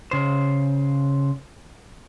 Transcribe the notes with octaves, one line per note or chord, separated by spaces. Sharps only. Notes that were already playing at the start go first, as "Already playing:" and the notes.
C#3 C5